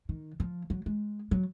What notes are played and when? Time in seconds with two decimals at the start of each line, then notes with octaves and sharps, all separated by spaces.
0.09 D#3
0.40 F3
0.70 F#3
0.86 G#3
1.31 F#3